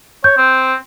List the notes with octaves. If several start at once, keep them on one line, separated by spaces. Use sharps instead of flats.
C#5 G6
C4